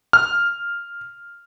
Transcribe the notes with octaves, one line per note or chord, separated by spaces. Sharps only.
F6